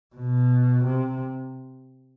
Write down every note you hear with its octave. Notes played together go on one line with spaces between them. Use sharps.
B2
C3